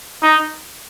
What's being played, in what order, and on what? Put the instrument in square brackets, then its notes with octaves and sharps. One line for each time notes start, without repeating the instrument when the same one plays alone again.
[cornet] D#4